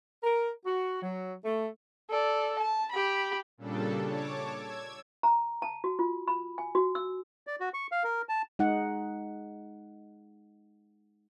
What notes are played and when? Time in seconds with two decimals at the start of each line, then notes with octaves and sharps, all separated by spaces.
0.22 A#4
0.65 F#4
1.00 F#3
1.43 A3
2.10 A4 D5
2.59 A5
2.92 G4 B5
3.58 A#2 C#3 G3 D4 A4
4.03 C#5 A5 D6
4.54 E6 G#6
5.23 A#5
5.62 A5
5.84 F#4
5.99 F4
6.28 B5
6.58 G#5
6.75 F#4
6.95 E6
7.47 D5
7.60 F#4
7.74 C#6
7.92 F5
8.04 A#4
8.29 A5
8.59 G#3 D#4 F#5